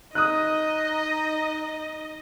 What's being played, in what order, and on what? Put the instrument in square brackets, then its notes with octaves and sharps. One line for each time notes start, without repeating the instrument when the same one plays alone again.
[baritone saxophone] D#4 [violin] D#5 [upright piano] D#6 F#6